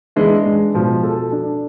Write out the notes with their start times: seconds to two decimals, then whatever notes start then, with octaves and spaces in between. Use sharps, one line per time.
0.16 E3 G#3 D4
0.46 G#3
0.74 B2 F3
1.03 A4
1.32 D4